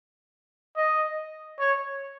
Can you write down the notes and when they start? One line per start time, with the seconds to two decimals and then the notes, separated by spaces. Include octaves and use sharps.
0.76 D#5
1.59 C#5